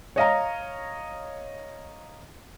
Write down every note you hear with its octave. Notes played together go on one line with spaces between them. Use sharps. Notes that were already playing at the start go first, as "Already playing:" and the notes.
C#5 D#5 F5 A#5